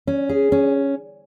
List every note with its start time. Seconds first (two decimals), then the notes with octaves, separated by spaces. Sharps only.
0.07 C#4
0.29 G#4
0.52 C#4